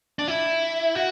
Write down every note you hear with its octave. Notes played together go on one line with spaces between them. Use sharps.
D4
E4
F#4